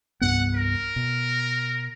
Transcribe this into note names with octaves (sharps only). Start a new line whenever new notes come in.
C2 G2 B3 F#5
A#4
B2